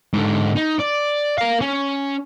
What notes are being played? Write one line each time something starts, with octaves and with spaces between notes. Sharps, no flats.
G#2 D3
D#4
D5
A#4 F5
C#4